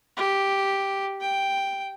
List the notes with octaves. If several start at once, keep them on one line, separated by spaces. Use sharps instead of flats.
G4
G5